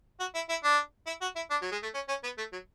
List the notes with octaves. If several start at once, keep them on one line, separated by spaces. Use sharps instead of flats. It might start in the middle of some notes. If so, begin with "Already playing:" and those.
F#4
E4
E4
D4
E4
F#4
E4
D4
F#3
G#3
A3
C#4
C#4
B3
A3
F#3